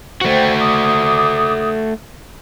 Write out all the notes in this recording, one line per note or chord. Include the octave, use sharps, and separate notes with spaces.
A3 F#4 C5 G5
D6 D#6